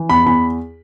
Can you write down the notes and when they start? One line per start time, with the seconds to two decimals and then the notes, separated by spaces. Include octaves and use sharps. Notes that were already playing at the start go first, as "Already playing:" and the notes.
Already playing: E3
0.10 E2 B5
0.26 E2 B5